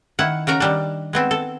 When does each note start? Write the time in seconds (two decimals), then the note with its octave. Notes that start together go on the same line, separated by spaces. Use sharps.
0.19 D#3 E4 F#5
0.47 C#3 F#4 A#4 A#5
0.60 D#3 G3 D4
1.13 G#3 B3 C4
1.31 A4